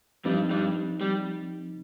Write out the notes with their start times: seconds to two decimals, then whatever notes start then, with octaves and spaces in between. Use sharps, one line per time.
0.25 G2 F3 G3 C4 D#4
0.50 G2 G3
1.01 G3